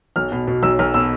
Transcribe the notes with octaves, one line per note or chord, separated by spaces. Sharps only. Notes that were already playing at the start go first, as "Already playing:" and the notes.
B1 F6
B2
B2
B1 E6
B1 F6
B2 E6